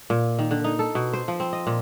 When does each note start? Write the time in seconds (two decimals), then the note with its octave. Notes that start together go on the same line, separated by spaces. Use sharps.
0.10 A#2
0.39 D#3
0.51 D3
0.64 D#4
0.79 A4
0.95 B2
1.13 C5
1.28 F3
1.40 C4
1.53 D#5
1.67 A#2